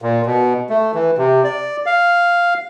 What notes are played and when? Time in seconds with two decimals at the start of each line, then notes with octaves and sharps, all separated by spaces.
0.02 A#2
0.26 B2
0.70 A3
0.95 E3
1.18 C3
1.44 D5
1.86 F5